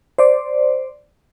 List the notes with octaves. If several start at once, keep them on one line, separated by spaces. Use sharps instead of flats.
C5 D5